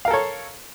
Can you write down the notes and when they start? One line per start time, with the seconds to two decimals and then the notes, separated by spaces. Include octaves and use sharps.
0.05 F5
0.08 A#4
0.11 A4
0.13 C#5